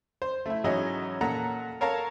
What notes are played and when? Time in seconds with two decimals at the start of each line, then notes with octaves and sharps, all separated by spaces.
0.22 C5
0.46 A3 E4
0.64 G#2 E3 F#3 C#4 D#5
1.21 A#2 A4 F#5 A#5
1.81 A4 A#4 C#5 F5 A5 A#5